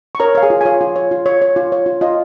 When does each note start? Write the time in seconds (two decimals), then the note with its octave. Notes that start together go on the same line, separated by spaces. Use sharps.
0.15 C#6
0.20 A#4 C#5 A#5
0.35 C#5 F5
0.42 G#4 G#5
0.50 F4
0.61 G#5
0.65 F4 C#5 F5
0.81 F4
0.96 C#5
1.11 F4
1.26 C#5
1.42 C#5
1.56 F4
1.72 C#5
1.86 F4
2.01 F4 D#5